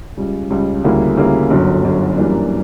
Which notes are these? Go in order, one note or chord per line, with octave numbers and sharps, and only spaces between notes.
C#2 C#3 G3
C#2 C#3 G3
D2 C#3 G3 A#3 E4
D2 C#3 G3 A#3 E4
G1 F#2 D3 F#3
G1 F#2 D3 F#3
F#2 E3 G3 A#3 D4